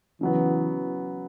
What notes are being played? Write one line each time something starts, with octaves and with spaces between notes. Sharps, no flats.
C#3 E3 F#3 B3